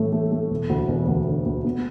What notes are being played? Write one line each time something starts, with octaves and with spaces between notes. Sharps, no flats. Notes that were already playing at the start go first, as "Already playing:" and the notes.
Already playing: A2 E3 A3
A3
A3
E1
D2
E1
D2
D3
D2
B3